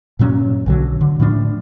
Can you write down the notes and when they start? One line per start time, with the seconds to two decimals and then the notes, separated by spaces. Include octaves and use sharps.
0.19 G2 A#2 F#3 C#4
0.66 B1 D3 F#3
1.01 D3
1.20 A2 F3 D4